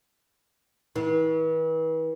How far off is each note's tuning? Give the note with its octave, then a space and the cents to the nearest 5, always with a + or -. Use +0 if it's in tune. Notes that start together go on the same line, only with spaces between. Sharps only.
E3 -40